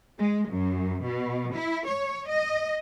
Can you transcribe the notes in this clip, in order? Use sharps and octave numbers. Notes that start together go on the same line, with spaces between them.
G#3
F#2
B2
E4
C#5
D#5